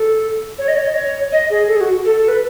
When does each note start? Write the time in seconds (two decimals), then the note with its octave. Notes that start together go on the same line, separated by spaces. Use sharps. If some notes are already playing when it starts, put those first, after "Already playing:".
Already playing: A4
0.58 C#5
0.68 D#5
0.76 C#5
0.85 D#5
0.94 C#5
1.32 D#5
1.50 G#4
1.67 A4
1.76 G#4
1.81 F#4
2.05 A4
2.16 A4
2.28 B4